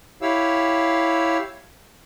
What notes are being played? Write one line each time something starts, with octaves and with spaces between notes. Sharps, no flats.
E4 G4 C#5 F5 E6